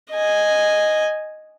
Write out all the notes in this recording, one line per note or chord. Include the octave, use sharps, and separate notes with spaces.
D#5 G#5